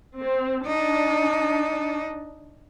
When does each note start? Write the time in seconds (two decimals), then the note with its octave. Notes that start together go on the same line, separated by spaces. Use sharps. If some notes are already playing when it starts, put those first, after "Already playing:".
0.19 C4
0.66 D4 D#4